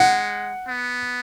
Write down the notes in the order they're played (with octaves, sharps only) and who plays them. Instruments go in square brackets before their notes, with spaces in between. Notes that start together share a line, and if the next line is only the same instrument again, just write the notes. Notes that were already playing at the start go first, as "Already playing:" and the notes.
Already playing: [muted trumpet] G#3 [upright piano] F#5
[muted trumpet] B3